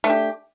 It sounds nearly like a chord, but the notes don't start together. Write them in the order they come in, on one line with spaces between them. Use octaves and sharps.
A3 D4 G4